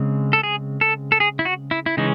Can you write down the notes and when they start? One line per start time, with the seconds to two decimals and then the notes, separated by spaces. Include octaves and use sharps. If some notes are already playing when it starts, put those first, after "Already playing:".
Already playing: C#3 G#3 C4
0.33 A4
0.43 G#4
0.81 A4
1.12 A4
1.20 G#4
1.39 E4
1.45 F#4
1.71 E4
1.86 E4
1.97 C#3 E3 G#3 C#4 D#4